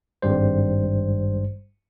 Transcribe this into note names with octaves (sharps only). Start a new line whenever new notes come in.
G#1 G2 G3 C5